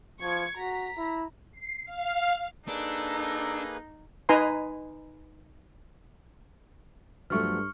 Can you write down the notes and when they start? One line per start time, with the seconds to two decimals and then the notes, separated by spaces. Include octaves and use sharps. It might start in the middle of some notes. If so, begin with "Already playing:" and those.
0.22 F3 C#6 G#6 C#7
0.58 F#4 A#5 B6
0.97 E4
1.52 C7
1.85 F5
2.68 A#3 D4 D#4 G#4 A4 B4
4.29 D#4 B4 G#5 A#5 C6
7.30 G2 F3 F#3 A3 C#6 F6